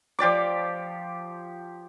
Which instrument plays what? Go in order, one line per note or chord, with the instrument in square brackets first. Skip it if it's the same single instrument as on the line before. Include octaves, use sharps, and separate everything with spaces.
[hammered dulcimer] F3 G4 D5 D6